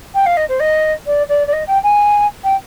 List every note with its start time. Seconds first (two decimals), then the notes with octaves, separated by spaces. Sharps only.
0.14 G5
0.26 F5
0.37 D#5
0.49 C5
0.60 D#5
1.06 D5
1.29 D5
1.47 D5
1.53 D#5
1.67 G5
1.83 G#5
2.44 G5